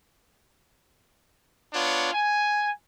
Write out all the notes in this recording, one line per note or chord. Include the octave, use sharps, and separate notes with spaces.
B3 D4 F4 C#5
G#5